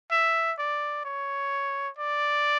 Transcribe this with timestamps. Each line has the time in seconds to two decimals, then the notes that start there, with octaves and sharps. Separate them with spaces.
0.11 E5
0.59 D5
1.05 C#5
1.99 D5